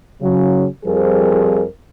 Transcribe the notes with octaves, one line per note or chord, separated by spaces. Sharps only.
C#3 F#3
F2 F3 G3 G#4 A#4 C5